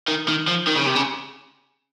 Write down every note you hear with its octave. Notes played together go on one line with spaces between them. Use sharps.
D#3
D#3
F3
D#3
C#3
C3
C#3